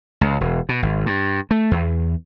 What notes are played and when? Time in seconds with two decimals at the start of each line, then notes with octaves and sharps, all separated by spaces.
0.21 C#2
0.41 E1
0.69 B2
0.82 G#1
1.06 G2
1.51 A3
1.71 E2